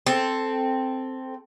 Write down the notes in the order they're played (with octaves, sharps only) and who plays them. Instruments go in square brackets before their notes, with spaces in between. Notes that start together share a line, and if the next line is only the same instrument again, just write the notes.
[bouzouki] C4 A4